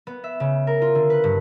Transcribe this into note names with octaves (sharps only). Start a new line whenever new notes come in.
B3
E5
C#3
A#4
F4
D3
B4
G2